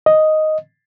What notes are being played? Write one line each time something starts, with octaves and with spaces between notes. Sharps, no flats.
D#5